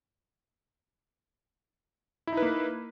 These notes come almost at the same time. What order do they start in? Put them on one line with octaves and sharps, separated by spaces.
E4 D#4 B4 A#3